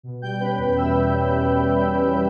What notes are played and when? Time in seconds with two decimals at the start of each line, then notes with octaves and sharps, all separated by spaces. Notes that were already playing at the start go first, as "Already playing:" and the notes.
0.03 B2
0.22 G3 G5 G6
0.40 C#4 B4 B5
0.58 E2
0.76 B2 E5 E6
0.95 G3
1.13 C#4
1.31 E2
1.49 B2
1.67 G3
1.86 C#4
2.04 E2